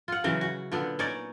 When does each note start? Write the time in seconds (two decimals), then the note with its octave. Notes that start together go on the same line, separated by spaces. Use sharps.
0.08 F4 F#5
0.24 C#3 E3 F#3 C#4
0.41 F#4
0.72 A#2 D3 B3
0.99 C#4 D#4 C#5 D5